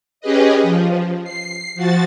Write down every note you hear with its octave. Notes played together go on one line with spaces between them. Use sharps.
C#4 G4 G#4 B4 D#5
F3
C7
F3 F#4 A6